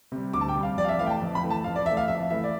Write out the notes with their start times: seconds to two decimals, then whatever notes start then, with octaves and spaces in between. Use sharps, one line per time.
0.12 C3 G3
0.33 D2 D6
0.41 A5
0.48 G5
0.56 C3 G3
0.63 F5
0.77 F2 D5
0.84 F5
0.88 E5
0.99 E3 F5
1.02 A3 G5
1.10 A5
1.21 F2
1.35 B5
1.43 E3 A3
1.50 A5
1.64 F2 F5
1.76 D5
1.86 E3 A3 E5
1.97 F5
2.08 F2 E5
2.30 E3 A3 E5
2.44 D5